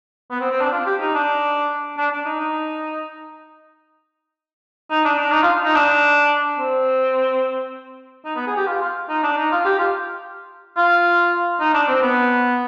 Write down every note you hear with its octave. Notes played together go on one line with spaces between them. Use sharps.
B3
C4
C4
D4
F4
G4
D#4
D4
D4
D4
D#4
D#4
D#4
D4
D4
D#4
F4
D#4
D4
C4
D#4
B3
G#4
G4
F4
F4
D#4
D4
D#4
F4
G4
F4
F4
D#4
D4
C4
B3